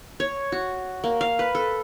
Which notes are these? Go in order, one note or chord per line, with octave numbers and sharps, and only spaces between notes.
C#5
F#4
A#3
F5
B4
A4